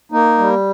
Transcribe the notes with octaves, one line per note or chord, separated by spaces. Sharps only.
A#3 D#4
G3